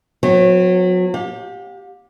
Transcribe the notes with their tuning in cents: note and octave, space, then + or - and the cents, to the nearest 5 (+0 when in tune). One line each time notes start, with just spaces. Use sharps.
F#3 -25 B3 +40
G4 +0 F5 +45